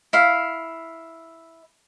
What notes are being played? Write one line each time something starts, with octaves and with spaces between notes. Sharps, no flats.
E4 F5